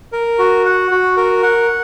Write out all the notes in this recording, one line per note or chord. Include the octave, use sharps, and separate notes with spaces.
A#4
F#4
F#5
F#4
A#4
F#5